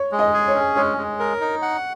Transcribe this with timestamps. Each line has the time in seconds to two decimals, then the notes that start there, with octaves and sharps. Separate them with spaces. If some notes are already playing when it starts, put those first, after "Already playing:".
Already playing: C#5
0.12 G#3
0.19 D#5
0.33 G#4
0.48 C#5
0.55 C#4
0.76 G#3 C#5
0.97 G#3
1.19 A#4
1.41 D#4
1.62 F#5